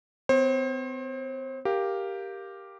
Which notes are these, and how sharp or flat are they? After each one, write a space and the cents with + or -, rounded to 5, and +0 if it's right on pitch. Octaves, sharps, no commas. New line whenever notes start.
C4 -45 C5 +35
G4 +0 A#4 +0 F5 +0